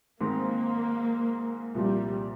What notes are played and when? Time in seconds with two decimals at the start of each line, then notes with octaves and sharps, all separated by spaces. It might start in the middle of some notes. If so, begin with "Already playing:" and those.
0.21 G#2 D#3 G#3 A#3 C4
1.75 C2 A#2 F3 G3 A#3